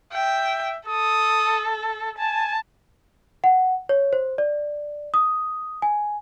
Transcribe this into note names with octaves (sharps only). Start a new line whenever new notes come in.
E5 G5
A4 D#6
G#5 A5
F#5
C#5
C5
D5
D#6
G#5